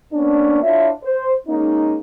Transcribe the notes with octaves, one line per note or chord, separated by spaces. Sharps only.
A#3 B3 C#4 D4
D4 E4 F4 C#5 E5
C5
G#3 A#3 C#4 D#4